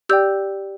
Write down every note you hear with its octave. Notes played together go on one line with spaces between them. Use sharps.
G4 D5 G5 E6 G6